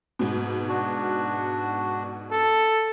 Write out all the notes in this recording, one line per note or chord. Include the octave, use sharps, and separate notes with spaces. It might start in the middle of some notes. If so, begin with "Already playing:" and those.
G#2 B2
D4 F#4
A4